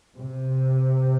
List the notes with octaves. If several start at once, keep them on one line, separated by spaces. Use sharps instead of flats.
C3